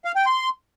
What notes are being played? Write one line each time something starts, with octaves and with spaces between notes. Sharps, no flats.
F5
G5
C6